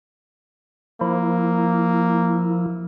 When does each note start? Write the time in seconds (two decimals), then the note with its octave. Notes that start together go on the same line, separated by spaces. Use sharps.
1.01 F3 A#3 E4